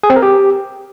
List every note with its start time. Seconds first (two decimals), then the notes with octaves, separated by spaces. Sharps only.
0.03 G#4
0.10 C4
0.16 A#4
0.23 G4